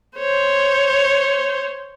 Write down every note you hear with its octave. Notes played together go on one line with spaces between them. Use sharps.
C5 C#5